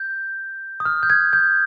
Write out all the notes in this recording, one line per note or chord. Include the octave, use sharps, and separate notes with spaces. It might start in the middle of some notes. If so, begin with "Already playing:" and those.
Already playing: G6
D#6
F6
G6
G#6
G6